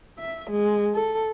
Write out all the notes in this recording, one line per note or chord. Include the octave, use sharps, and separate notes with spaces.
E5
G#3
A4